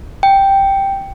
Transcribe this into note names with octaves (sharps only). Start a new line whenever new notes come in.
G5